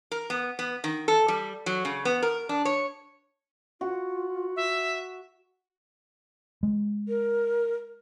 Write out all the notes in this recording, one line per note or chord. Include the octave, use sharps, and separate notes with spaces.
A#4
B3
B3
D#3
A4
G3
F#3
C#3
B3
A#4
D4
C#5
F4 F#4
E5
G#3
A#4